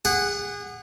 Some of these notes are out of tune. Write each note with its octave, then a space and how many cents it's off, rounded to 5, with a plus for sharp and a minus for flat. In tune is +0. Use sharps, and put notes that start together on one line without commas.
G#4 -35 F#5 +0